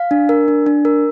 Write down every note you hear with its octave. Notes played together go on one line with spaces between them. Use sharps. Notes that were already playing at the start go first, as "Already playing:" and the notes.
Already playing: F5
D4
A#4
D4
D4
A#4